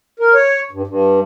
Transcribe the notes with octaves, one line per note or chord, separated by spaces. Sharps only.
A#4
C#5
G2
G2